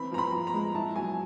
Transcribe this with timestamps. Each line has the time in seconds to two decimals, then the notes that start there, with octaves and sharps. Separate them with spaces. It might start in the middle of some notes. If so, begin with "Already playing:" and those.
Already playing: E3 C4 B5
0.12 F3 A#5
0.18 B5
0.32 F3
0.47 A#5
0.54 G#3
0.75 E4 A5
0.96 F#3 G#5